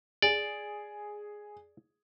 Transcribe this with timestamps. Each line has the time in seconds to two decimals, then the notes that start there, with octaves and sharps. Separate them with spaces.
0.22 G#4 D5